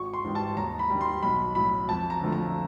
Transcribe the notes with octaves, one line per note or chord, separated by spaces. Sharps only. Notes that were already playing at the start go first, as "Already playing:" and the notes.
Already playing: G#1 C#6
C6
G#2 E3 G3
A5
D#2 A#5
B5
D#3 G3
C6
B1 B5
A2 F#3 B5
F2 A5
A#5
D3 F3 A3
A#5